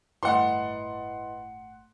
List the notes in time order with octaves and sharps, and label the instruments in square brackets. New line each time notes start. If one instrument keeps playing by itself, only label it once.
[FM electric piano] G1 A2 [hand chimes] E4 B4 D#5 [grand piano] F#5 C6